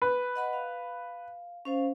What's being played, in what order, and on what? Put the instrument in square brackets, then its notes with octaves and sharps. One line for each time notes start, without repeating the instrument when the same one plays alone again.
[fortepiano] B4
[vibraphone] D#5 F#5 B5
F5
C#4 C5 F5